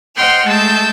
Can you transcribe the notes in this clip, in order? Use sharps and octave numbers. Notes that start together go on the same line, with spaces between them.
C5 D#5 F#5 G5 C6 F6
G#3 A3 A5 E6 G6